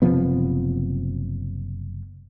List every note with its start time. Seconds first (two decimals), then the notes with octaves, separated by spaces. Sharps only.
0.02 F#1 C3 F3 B3